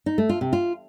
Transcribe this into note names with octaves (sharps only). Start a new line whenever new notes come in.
D#4
A3
F4
C3
F4